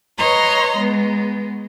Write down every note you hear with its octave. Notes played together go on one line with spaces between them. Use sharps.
B4 C#5 D#5 A#5 C6
G#3 B3